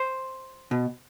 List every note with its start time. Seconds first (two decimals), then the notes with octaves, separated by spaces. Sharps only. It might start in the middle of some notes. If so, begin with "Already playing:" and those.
Already playing: C5
0.71 B2